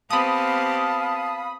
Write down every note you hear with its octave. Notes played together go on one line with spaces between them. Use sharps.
B3 C4 G4 F5 A5 B5 D#6